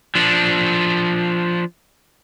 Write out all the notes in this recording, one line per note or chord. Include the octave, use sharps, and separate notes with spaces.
F3 D4